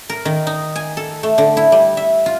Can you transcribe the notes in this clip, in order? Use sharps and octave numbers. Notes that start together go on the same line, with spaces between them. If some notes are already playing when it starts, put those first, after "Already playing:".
A#4
D#3
D#4
G#5
A4
A3
D3
E4
G3
E5
F4